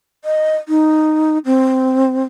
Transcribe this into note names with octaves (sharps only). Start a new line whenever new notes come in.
D#5
D#4
C4